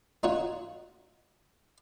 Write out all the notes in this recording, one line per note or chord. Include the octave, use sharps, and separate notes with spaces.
D#4 F4 F#4 C#5